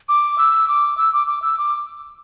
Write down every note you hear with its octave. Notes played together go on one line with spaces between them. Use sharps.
D6
E6
D6
E6
D6
D6
E6
D6